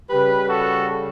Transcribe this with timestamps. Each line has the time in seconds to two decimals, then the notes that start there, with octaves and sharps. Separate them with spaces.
0.10 C#3 G3 G4 B4
0.48 F#4 A4